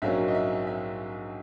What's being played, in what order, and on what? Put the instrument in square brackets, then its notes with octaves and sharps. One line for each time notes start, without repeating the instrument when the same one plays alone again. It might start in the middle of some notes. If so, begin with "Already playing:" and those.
[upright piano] A#1 G#2 F#3 A#3 C#4 E5
D#5
E5
E5